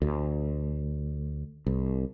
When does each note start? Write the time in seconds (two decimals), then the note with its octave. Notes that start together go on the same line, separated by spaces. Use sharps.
0.02 D2
1.67 C2